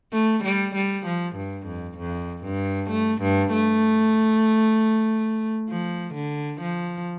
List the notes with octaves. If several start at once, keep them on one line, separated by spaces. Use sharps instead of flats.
A3
G3
G3
F3
G2
F2
F2
G2
A3
G2
A3
F3
D3
F3